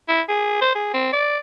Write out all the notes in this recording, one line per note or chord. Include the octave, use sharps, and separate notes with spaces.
E4
G#4
C5
G#4
C4
D5